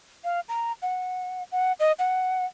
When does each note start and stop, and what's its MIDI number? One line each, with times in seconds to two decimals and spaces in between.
0.24 0.40 77
0.49 0.72 82
0.82 1.43 78
1.52 1.72 78
1.80 1.92 75
1.99 2.45 78